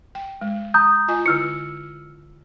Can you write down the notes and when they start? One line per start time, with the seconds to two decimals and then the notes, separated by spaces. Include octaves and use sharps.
0.15 G5
0.41 G#3
0.74 A#5 D#6 G6
1.08 F4 D#5 G#5
1.26 D3 E4 E6 F6 C#7